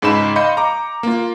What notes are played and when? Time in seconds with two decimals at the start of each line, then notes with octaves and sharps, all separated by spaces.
0.02 C#2 G#2 D#4 B5 E7
0.36 D#5 F5 B5 C6 G6 C#7
0.57 A#5 D6
1.03 A#3 F4